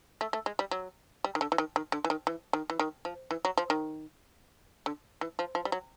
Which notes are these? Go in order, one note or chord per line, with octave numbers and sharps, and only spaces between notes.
A3
A3
G#3
G3
F#3
G3
D#3
D3
E3
D#3
D#3
D3
E3
D#3
E3
D#3
E3
D#3
F3
E3
F#3
F3
D#3
D3
E3
F3
F3
G3
F#3